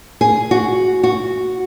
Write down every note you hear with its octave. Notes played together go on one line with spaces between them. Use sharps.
G#4
F#4
F#4